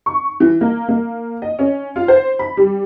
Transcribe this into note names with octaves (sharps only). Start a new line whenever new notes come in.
C#6
E3
A#3
A#3
D#5
C#4
F4
C5
B5
G3